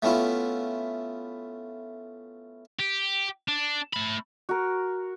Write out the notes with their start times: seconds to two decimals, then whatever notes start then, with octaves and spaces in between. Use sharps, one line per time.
0.02 A3 B3 C#4 E4 F4
2.80 G4
3.48 D4
3.93 A3 B5
4.49 F#4 A#4